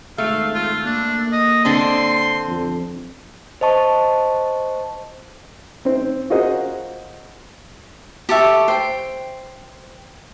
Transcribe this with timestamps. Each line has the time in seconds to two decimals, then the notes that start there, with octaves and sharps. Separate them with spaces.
0.18 G#1 A3 F5
0.54 F4
0.86 A#3 D4
1.32 D#5
1.65 D3 C4 D4 C6
2.47 F2
3.61 C5 D#5 A5 C#6
5.85 C4 D#4 C5
6.30 F4 F#4 G#4 A#4 C5 D#5
8.29 G4 A4 E5 C#6
8.68 C5 G5